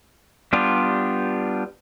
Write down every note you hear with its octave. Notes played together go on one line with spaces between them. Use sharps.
G3 B3 D4 F4 G4